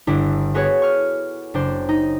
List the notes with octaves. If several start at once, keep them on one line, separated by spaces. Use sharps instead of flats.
G1 D4 E4 E7
B3 F#4 G#4 A4 B4 C#5
C#6 F6
F#1 D4 C5
D#4